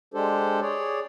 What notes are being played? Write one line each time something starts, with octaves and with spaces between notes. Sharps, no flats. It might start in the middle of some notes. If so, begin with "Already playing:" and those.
G#3 D4 G4 A4 C5
G#4 C#5 D5